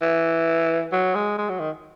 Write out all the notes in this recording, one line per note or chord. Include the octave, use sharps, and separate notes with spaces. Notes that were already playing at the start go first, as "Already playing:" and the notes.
E3
F#3
G#3
G#3
F#3
D#3